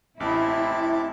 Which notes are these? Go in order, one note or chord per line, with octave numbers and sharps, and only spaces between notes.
A1 C4 E4 A5 D6